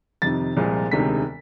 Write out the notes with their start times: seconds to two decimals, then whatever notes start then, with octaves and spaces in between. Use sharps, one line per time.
0.22 F2 C3 D#3 A6
0.56 C2 A#2 F3 G#3
0.92 E1 D2 C3 D#3 G#3 B6